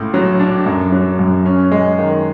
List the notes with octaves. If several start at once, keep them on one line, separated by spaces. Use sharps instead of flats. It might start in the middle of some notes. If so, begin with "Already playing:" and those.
Already playing: C#2 A2
F#3
D4
F#2
F#3
F#2
C#4
G#3
D#3